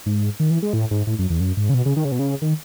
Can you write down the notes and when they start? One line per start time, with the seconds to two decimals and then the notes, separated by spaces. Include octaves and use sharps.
0.06 G#2
0.40 D#3
0.51 E3
0.62 G#3
0.73 A2
0.91 G#2
1.07 A2
1.19 F#2
1.30 E2
1.40 F#2
1.57 G#2
1.69 C#3
1.74 B2
1.86 C#3
1.96 D#3
2.05 C#3
2.12 B2
2.19 C#3
2.42 D#3